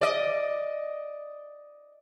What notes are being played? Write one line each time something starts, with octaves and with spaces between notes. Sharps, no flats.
D5 D#5